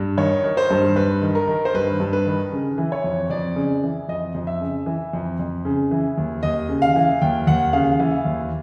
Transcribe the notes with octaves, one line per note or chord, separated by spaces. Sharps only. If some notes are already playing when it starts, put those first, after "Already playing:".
Already playing: G2
D#3 C#5
D#3
C5
G2
G2 B4
D#3
A#4
D#3
C5
G2 B4
G2
B4
D#3
C#3
E3
C#5
F2
F2 D5
C#3
E3
F2 D#5
F2
E5
C#3
E3
F2
F2
C#3
E3
D#2
D#2 D#5
C#3
F5
E3
D#2 G5
D#2 F#5
C#3 F5
E3 F5
D#2